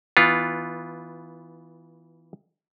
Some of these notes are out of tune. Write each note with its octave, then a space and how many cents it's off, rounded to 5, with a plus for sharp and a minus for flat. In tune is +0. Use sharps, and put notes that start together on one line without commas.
E3 -20 B3 +0 F4 +0